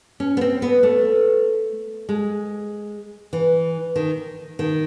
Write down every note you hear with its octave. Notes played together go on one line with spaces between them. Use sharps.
C#4
B3
C4
B3
A3
G#3
E3
D#3
D#3